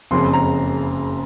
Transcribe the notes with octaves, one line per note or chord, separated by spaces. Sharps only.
F#1 F2 C#3 C6
A#5